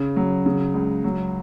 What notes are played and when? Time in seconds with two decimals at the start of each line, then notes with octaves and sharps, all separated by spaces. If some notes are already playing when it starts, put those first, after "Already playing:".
Already playing: C#3
0.16 F#3
0.46 C#3
0.74 C#2
1.04 F#3